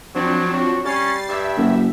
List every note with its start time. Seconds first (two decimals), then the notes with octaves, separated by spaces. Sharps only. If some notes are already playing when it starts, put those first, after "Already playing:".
0.15 F3 F#3 C4 D4 C5
0.54 F#3 F#4
0.86 G3 C#4 A6 C7
1.29 G2 E5
1.58 F#1 F#2